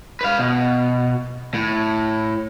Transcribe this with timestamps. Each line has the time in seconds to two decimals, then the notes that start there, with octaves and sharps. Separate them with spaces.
0.21 B4 F5
0.39 B2
1.54 A2